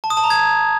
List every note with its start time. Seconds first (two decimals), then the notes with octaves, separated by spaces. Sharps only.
0.04 A5
0.10 D#6
0.17 A5
0.24 A#5
0.30 G#6